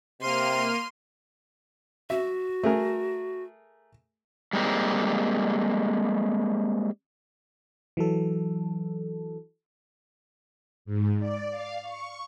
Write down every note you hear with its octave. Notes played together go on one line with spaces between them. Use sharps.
C3 A#3 C6 F6 D#7
F#4 E5
A3 G#4 A#4
G3 G#3 A#3 C4
E3 F#3 A4
G#2
D5
F5
C#6